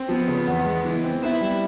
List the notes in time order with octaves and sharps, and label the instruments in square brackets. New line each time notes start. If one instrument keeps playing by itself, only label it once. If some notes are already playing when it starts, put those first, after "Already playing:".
Already playing: [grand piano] C4
[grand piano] F3 [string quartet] B3
[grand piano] C#3
E2
G#3
E3
C4
[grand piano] B3 [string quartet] E4
[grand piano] G3